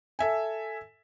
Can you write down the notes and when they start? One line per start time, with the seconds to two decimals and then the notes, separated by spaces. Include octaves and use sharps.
0.19 A4 E5 G#5